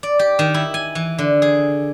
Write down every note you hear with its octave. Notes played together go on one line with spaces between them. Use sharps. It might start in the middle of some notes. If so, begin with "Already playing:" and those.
D5
G4
D#3
E4
G#5
E3
D3
G#4